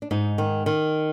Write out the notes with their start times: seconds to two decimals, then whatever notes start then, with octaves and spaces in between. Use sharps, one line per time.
0.02 D4
0.11 G#2 D#4
0.38 D#3
0.66 D#3